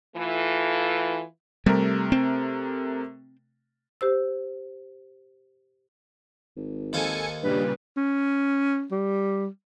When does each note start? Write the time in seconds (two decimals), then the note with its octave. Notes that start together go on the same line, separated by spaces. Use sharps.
0.16 E3 A3 F4
1.66 C3 G3 A3 A#4
2.12 C4
4.01 G4 C5 E6
6.57 G#1
6.93 D#2 A4 C5 F5 G#5 C#7
7.43 G2 A#2 C#3 G3 B4
7.97 C#4
8.92 G3